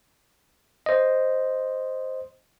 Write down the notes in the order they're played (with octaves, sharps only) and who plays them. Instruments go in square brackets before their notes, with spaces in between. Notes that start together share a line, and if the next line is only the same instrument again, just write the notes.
[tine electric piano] C5 D#5